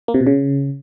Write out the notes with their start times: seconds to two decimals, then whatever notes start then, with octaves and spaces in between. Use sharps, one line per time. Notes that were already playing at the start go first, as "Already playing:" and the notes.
0.08 A#3
0.14 C3
0.20 B2
0.27 C#3